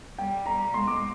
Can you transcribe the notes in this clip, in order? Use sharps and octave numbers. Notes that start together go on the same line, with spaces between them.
G3 G5
A#5
G#3 C6
D6